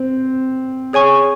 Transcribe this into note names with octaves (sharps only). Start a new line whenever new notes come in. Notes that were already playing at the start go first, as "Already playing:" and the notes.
Already playing: C4
G#4 C#5 G#5 C#6